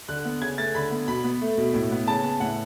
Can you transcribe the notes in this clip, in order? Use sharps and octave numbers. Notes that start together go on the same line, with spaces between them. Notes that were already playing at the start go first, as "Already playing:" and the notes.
D3 F#6
B3
C#3 G#6
A3 A6
D3 B5
B3
B2 B5
B3
A3
B2
A2
B3
C#3 A5
B3
A2 F#5